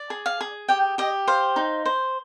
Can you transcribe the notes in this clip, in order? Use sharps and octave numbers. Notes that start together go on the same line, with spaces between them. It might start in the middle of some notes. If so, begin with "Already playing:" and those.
Already playing: D5
G#4
F5
G#4
G4 G5
G4 D#5
C5 F5
D#4
C5